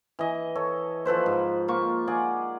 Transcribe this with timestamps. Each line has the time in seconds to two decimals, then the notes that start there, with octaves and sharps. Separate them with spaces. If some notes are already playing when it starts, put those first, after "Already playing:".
0.19 E3 D#5
0.55 A4 C#5
1.05 F3 A4 B4 C5
1.26 G#2
1.68 A#3 F4 C#6
2.07 G#4 D5 F#5